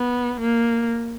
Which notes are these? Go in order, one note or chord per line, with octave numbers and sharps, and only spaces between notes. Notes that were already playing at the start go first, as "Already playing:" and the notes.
Already playing: B3
A#3